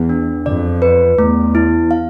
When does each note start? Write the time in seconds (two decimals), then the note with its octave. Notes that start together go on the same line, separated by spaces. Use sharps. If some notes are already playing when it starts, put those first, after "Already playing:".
Already playing: E2
0.09 D4
0.46 F2 D5
0.82 B4
1.18 E2 A3
1.55 E4
1.91 F5